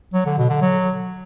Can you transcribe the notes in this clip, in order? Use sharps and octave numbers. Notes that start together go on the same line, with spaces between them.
F#3
D3
B2
D3
F#3